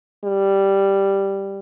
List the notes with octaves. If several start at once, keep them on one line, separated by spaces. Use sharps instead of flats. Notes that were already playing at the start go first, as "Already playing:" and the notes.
G3